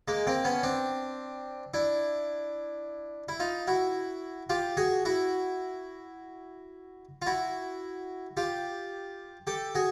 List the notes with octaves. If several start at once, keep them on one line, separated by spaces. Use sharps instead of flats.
G#3 A#3
A#3 C4
B3 C#4
C4 D4
D4 E4
E4
D#4 F4
E4 F#4
F4 G4
F#4 G#4
E4 F#4
F4
E4 F#4
F4 G4
G4 A4
F#4 G#4